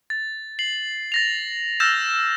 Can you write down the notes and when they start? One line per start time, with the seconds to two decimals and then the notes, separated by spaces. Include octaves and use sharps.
0.10 A6
0.59 C7 F#7
1.12 A6 A#6 F7
1.80 E6 F6 G6 A6 A#6 E7